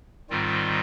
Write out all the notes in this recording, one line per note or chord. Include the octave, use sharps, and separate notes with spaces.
G#2 D#3 G3 C4 F4